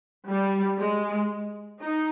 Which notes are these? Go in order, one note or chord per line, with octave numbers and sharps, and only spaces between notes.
G3
G#3
D#4